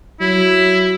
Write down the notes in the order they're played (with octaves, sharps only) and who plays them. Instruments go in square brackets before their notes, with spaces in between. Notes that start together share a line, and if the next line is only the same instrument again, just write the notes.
[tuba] F#3 [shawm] E4